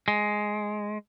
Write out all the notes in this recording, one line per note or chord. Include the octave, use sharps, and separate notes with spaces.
G#3